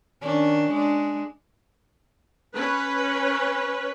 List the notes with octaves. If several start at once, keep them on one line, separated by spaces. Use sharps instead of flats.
D#3 C#4 D4
G#3 D4
C#4 B4